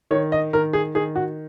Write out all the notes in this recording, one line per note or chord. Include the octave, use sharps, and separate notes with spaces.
D#3 C#5
D#5
D#3 A#4
G#4
D#3 G#4
F#4